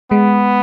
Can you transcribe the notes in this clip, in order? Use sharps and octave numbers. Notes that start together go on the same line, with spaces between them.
G#3 B3